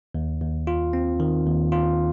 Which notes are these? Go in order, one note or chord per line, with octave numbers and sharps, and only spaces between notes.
D#2
D#2
F4
C4
D#3
D#2
F4